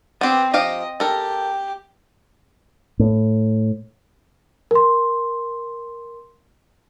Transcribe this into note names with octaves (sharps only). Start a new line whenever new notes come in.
B3 C4 G4
F3 G4 D#5 F5
G4 A4 A#4
A2
A#4 C6